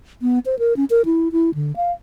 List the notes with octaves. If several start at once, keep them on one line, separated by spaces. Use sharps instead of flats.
B3
C5
A#4
C#4
A#4
E4
E4
D3
F5